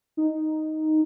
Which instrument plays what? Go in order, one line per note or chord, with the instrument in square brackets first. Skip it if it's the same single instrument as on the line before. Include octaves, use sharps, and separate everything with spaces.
[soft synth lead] D#4